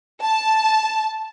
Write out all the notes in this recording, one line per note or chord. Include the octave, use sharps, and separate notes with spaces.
A5